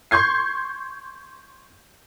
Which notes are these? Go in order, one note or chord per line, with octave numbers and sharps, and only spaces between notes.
C6 C#6 G6 G#6 C7